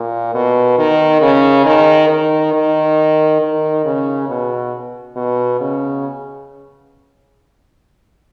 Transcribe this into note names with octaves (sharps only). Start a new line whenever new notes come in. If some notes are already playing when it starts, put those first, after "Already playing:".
Already playing: A#2
B2
D#3
C#3
D#3
D#3
D#3
D#3
C#3
B2
B2
C#3